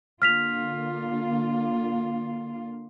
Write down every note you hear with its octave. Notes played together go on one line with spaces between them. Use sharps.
D3 A#3 F4 F6 B6 F7